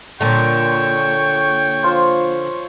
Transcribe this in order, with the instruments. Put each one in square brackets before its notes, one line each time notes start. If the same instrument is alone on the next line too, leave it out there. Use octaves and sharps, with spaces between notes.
[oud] A#2 D3 [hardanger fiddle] C#5 C#6 [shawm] G5
[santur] F3 F4 C5